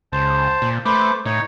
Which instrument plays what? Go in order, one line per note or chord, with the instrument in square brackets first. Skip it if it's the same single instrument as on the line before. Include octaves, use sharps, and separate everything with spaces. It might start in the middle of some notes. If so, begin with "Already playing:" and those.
[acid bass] C#2 [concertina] C5 A5
[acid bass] A#2
[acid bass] A3 [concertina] B4 C5 D6
[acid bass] A2 [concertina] D#4 C#5